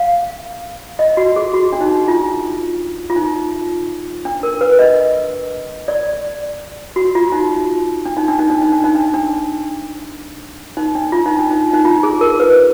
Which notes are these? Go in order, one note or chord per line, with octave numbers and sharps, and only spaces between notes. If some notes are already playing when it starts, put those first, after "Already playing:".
Already playing: F5
D#5
F#4
G#4
F#4
D4
D#4
F4
F4
D#4
D4
A#4
B4
D#5
D5
F#4
F4
D#4
D4
D#4
D4
D#4
D4
D#4
D4
D#4
D4
D4
D#4
D4
F4
D#4
D4
D#4
D#4
F4
G#4
A#4
B4